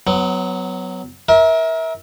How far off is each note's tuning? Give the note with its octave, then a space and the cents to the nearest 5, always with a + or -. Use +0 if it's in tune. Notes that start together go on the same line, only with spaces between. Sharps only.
F#3 +0 B3 +25
A#4 +20 E5 -25